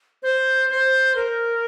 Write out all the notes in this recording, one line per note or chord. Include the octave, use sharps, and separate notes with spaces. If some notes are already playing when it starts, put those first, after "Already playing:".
C5
C5
A#4